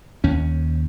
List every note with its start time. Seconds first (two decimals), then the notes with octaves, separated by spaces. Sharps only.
0.24 D#2 C#4